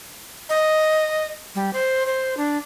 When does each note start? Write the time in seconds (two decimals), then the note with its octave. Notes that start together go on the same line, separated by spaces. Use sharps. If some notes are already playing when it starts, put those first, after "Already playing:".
0.49 D#5
1.55 G3
1.73 C5
2.06 C5
2.37 D4